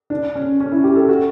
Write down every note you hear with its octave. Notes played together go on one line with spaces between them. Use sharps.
D4
C#4
C#4
E4
G4
A4
F#4